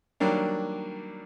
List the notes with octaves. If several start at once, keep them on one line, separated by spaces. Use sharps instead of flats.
D#3 F#3 G3 A#3 D4